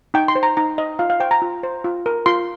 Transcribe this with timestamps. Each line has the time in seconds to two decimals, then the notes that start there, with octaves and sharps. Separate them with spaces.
0.14 D#4 G5
0.28 C6
0.35 C5
0.43 A#5
0.57 D#4 A#5
0.78 C5 D#5
0.99 F4 F5
1.10 F5
1.20 C5 G5
1.31 A#5
1.42 F4
1.63 C5
1.84 F4
2.06 A#4
2.26 F4 C6